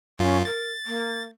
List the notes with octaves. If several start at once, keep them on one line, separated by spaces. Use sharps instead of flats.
F#2 C#4 F4
A#4 A6
A#3